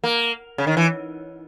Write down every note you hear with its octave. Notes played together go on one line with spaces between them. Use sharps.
A#3
C#3
D#3
E3